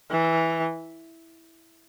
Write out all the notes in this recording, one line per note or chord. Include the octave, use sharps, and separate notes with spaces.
E3